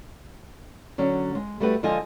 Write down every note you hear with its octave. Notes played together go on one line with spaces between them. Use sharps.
D3 F#3 C#4 D4
G#3
G3 A3 F#4 G4 B4
D3 F3 G#3 F4 D#5 G#5